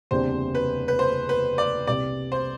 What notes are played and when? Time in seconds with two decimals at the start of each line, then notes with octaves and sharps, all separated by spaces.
0.11 F#1 E2 C3 G3 D4 C5
0.55 B4
0.88 B4
0.99 C5
1.29 B4
1.58 D5
1.87 C2 C3 G3 D5
2.32 C5